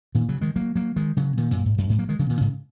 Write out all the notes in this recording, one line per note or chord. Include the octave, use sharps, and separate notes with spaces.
A#2 D#3
C#3 F#3
D#3 G#3
F#3 A#3
F#3 A#3
D#3 G#3
C#3 F#3
A#2 D#3
F#2 A#2
G#2
F#2
G#2
F#3 A#3
D#3 G#3
C#3 F#3
A#2 D#3
G#2 C#3